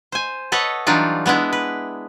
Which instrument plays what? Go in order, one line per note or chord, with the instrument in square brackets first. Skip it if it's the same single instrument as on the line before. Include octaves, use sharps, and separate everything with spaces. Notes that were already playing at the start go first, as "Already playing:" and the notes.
[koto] C5 G#5
A4 B4 C#5 D#5 F#5
E3 F#3 G3 D4 D#4 F4
G#3 B3 D4 E4
B4